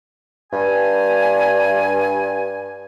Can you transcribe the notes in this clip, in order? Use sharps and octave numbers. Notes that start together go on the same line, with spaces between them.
G2 G#5